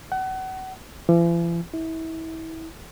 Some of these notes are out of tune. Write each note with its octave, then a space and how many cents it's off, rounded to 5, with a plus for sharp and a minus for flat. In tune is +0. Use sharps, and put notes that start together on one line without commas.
F#5 +30
E3 +45
E4 -30